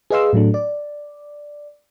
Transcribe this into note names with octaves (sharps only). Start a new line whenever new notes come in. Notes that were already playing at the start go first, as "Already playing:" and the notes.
G#4 B4 D#5 F5 C6 E6
A2 F#3 A3 D4
D5